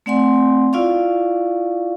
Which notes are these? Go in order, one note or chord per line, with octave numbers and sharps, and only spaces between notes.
A3 C4 D5 F#5 G#5 C6
E4 F4 D5 F5 C#6